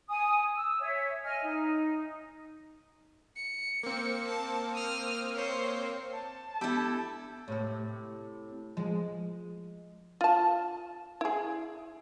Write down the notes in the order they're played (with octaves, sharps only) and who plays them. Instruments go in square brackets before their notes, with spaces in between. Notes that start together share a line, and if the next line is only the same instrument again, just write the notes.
[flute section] G#5 D#6
E6
C#5 E5
D#5 G#5 F6
D#4
[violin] C#7
[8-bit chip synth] A#3 C4
[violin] A5
D#6 F6
C5 C#5
[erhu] A5
[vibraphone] B3 [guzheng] E4 G4 [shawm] A4
[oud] A2 C3 C4
[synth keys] F3 [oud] G#3
[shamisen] F4 A5
E4 G#4